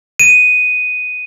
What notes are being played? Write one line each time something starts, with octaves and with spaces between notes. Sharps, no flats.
D#7